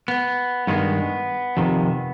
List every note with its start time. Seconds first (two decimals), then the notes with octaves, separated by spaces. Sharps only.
0.08 B3
0.67 G2 D#3 G#3 B3
1.57 F2 C3 D#3